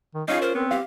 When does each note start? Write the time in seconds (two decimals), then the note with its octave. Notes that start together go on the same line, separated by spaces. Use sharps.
0.14 D#3
0.28 C#4 D#4 F4 G#4 F5
0.42 A#4 C5
0.55 B3 C4
0.71 G4 F5